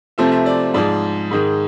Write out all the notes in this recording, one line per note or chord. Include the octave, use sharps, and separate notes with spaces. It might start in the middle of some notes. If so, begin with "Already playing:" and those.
C3 F3 A3 C4 E5
E5
D5
G#2 F3 G#3 D5
G#2 D#3 G#3